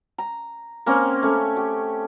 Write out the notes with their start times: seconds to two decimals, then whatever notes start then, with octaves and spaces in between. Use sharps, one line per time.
0.18 A#5
0.86 A#3 C4 C#4
1.23 A3 C#4
1.57 G4